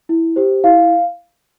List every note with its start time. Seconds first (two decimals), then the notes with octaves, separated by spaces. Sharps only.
0.09 E4
0.36 G4 C5
0.64 E4 F5